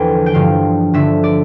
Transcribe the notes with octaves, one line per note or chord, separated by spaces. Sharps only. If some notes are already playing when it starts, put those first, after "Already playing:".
Already playing: E2 D3 F3 A4 G5
G5
G2 D3 F3 F5
G2 D3 F3 E5
D5